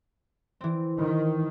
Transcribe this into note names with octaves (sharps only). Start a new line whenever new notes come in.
E3 C4
D#3